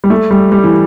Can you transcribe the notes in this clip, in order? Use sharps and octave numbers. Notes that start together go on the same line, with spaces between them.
G3
A3
G3
G3
E3